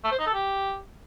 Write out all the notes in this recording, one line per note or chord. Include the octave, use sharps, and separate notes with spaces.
A3
C5
D#4
A4
G4